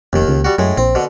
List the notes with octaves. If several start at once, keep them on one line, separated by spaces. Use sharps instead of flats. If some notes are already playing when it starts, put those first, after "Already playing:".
F1 D#2 D#3
C#2
G3 F#4
F#2 A2 G#3
A#1 C4
B2 D3